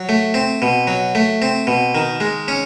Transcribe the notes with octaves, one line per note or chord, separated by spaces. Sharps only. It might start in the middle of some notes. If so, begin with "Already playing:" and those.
Already playing: F#3
A3
C4
B2
F#3
A3
C4
B2
D#3
G#3
C#4